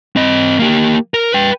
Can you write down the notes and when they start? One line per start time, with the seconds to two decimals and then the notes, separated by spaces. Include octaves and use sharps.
0.16 C4 D#5
0.59 A#3 G4
1.14 A#4
1.32 B4 G5